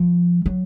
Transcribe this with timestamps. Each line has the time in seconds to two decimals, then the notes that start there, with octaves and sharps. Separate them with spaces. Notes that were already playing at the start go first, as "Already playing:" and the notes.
Already playing: F3
0.46 F#3